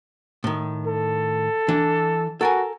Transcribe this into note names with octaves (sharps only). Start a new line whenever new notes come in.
A2 D#3
A4
E3 D4
F#4 A4 A#4 G#5